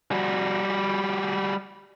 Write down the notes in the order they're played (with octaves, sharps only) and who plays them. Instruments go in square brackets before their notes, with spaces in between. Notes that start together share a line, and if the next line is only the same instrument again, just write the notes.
[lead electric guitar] G3 F#4